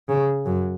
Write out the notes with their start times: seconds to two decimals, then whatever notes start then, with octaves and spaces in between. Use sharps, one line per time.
0.09 C#3
0.46 F#2